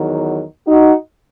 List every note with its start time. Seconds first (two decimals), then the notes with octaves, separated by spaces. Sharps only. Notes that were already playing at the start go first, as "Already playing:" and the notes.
Already playing: E2 D#3 F#3
0.67 D#4 F#4